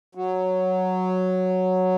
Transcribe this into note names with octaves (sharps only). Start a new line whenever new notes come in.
F#3